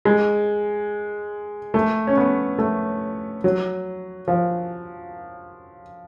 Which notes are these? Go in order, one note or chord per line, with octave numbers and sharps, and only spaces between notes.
G#3
A3
C#4
B3
A3
F#3
F3